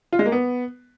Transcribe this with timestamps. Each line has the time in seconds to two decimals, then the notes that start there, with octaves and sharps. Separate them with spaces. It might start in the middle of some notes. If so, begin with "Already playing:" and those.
0.13 F4
0.19 G#3
0.26 A#3
0.32 B3